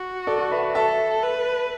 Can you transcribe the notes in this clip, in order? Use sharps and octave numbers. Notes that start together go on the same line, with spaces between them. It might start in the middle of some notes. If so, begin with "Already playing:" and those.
Already playing: F#4
A4 D5
B4 E5
A4 E5 A5
B4